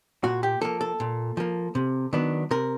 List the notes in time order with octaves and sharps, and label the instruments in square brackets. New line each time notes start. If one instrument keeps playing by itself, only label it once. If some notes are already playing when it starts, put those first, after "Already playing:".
[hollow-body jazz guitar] A#2 F#4
G4
F3 A#3 A4
A4
A#2
F3 A#3
C3
D#3 F#3 B3 D4
C3 A#4